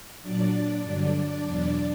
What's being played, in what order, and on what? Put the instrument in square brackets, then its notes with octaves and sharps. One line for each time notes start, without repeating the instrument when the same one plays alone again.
[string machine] A#2 F#3 D4 D5
G2 D3 F#3
E2 B2 F#3